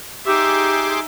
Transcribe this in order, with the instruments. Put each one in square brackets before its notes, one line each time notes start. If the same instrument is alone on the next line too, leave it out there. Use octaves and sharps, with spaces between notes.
[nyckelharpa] D#4 E5 [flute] G4 [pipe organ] G#4 C6 D6